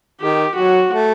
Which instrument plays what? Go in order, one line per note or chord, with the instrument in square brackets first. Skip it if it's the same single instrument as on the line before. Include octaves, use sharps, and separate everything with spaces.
[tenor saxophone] D#3 [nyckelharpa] G4
[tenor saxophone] F#3 [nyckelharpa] F#4
[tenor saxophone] A3